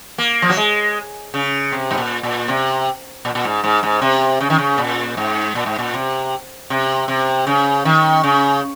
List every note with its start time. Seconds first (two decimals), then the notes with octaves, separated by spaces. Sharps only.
0.18 A#3
0.42 F3
0.50 F#3
0.57 G#3
1.34 C#3
1.72 C3
1.91 G#2
1.98 A#2
2.23 A#2
2.48 C3
3.25 A#2
3.35 A#2
3.44 G#2
3.64 G#2
3.83 G#2
4.02 C3
4.41 C#3
4.50 D#3
4.58 C#3
4.78 A#2
5.17 G#2
5.55 A#2
5.66 G#2
5.78 A#2
5.94 C3
6.70 C3
7.08 C3
7.47 C#3
7.85 D#3
8.23 C#3